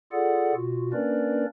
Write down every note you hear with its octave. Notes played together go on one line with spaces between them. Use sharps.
F4 G#4 A4 D5 F#5
B2 F4 F#4
A#3 C#4 D4 A#4 B4 D5